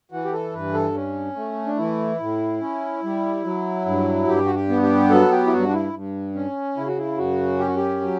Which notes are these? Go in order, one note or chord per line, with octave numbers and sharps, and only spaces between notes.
E3 F#4
G4
A4
G2 B4
A4
C#4
A3
D4
E3 E4
A2
C#4
G3
F#3
G2
G2 G4
F#4
G4
B3
G4
F#3 A4
G4
E4
G2 F#4
D4
E4
G2
C#4
C#3 E4
F#4
E4
F#2 F#4
C#4 G4
F#4
G4
F#3